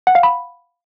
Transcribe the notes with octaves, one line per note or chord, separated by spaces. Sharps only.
F#5
F5
B5